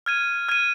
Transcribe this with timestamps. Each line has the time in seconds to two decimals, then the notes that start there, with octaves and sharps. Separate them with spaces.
0.06 F6 G#6 D#7
0.49 F6 G#6 D#7